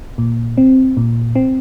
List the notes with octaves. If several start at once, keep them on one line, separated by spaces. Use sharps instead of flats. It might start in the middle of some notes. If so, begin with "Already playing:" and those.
A#2
C4
A#2
C4